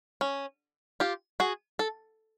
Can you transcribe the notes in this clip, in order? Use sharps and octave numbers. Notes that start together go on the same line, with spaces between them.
C#4
F4 G4
F#4 G#4
A4